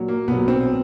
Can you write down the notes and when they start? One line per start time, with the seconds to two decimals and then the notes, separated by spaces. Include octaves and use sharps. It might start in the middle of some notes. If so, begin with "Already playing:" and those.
Already playing: A#2 F#3
0.08 A#3
0.28 B1 A#2 F#3 B3
0.48 C4